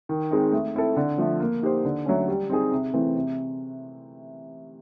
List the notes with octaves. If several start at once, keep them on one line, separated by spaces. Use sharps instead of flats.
D#3
G#3 C4 D#4
A3
C4 E4 A4
D3
F3 A3
A#3
D#4 G4 C5
D3
F#3 A3 C#4
G3
C4 D#4 G#4
C3
E3 A3 C4
C3